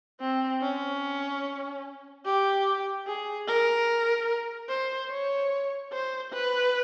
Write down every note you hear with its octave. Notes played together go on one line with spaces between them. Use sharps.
C4
C#4
G4
G#4
A#4
C5
C#5
C5
B4